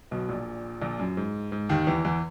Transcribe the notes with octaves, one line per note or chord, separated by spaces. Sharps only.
B1 B2
A#1 A#2
A#1 A#2
F#2
G#2
G#2
D#2 D#3
E2 E3
E2 E3